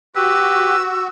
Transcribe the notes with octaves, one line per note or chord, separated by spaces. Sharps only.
F#4 G4 B4 E6